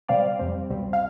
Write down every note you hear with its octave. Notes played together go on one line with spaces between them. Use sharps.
B2 G3 C4 D5 F5
F2 C3 G3 C4
C2 B2 G3 C4
F5